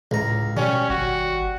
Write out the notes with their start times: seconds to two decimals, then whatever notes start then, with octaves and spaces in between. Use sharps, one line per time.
0.11 C#2 A2 A#5
0.57 B2 G3 C#4
0.90 G#1 F#4